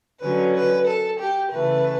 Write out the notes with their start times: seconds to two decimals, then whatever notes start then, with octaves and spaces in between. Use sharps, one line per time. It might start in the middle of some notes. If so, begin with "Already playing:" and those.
0.22 D3 F#3 C#4 B4
0.54 B4
0.87 A4
1.19 G4
1.52 C#3 E3 A3 B4